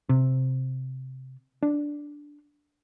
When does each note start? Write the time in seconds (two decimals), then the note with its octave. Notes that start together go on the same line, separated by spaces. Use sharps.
0.09 C3
1.63 D4